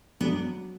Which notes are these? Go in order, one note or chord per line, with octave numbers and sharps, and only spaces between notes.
F#3 B3 D4